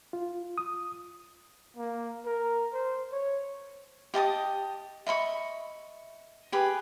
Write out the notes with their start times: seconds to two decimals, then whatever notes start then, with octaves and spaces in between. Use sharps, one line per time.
0.13 F4
0.58 D#6
1.76 A#3
2.25 A#4
2.73 C5
3.12 C#5
4.14 G4 D#5 A5 D#6
5.07 D#5 E5 B5 C#6
6.52 G4 G#4 B4